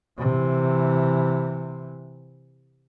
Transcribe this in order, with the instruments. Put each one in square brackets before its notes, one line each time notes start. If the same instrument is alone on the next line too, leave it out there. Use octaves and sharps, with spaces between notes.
[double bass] C3 E3